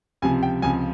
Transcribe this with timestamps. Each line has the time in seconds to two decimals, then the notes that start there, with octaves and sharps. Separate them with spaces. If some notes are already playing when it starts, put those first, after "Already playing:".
0.22 C#2 C3 F3 G#5
0.43 G5
0.62 C#2 C3 F3 G#5